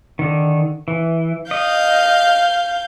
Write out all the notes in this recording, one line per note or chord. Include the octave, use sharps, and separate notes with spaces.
D3 D#3
E3
D#5 F5 G6